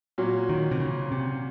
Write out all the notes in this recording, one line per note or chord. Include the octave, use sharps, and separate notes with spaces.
A#2 F#3 C#4 F#4
D#3
C3
C#3
C3